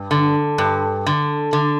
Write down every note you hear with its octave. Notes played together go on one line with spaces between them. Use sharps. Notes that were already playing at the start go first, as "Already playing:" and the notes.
Already playing: G2
D3
G2
D3
D3